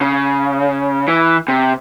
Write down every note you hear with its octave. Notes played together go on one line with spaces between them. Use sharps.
C#3
E3
C3